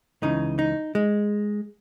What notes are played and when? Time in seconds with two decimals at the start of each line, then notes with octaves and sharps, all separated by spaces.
0.22 C#2 C#3 E3 D#4
0.59 D#4
0.95 G#3